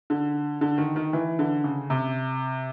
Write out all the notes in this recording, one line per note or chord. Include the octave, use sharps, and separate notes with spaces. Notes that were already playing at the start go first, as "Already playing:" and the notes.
D3
D3
D#3
D#3
E3
D3
C#3
C3